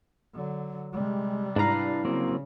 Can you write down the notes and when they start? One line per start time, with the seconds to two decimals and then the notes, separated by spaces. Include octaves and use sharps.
0.33 D3 F#3
0.93 C3 G3 G#3
1.56 G#2 D4 E4 B4 F5 A#5
2.05 C#3 F#3 A#3 C4